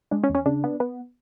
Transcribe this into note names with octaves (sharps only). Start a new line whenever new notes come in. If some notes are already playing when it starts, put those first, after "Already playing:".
G#3 D4
C#4
E2
C#4
C#3 D4
B3
B3